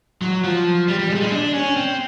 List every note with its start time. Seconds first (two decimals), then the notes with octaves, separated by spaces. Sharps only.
0.22 F#3
0.44 F3
0.88 G3
0.99 G3
1.10 G#3
1.15 G3
1.21 G#3
1.32 D4
1.54 C#4
1.76 C4